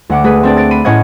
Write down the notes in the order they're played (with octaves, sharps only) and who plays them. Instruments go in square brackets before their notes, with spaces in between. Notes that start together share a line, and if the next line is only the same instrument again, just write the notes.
[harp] D2 F#5 D6
A3 G#4 B4
C4 D4 D5
A6 D7
B5 C7 D#7
A2 C#4 C#5 D#5 F#5 G#6